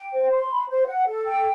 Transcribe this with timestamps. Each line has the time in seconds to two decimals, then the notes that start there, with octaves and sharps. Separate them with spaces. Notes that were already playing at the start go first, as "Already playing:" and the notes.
Already playing: G5
0.12 C5
0.31 C6
0.50 B5
0.69 C5
0.87 F#5
1.07 A4
1.25 G5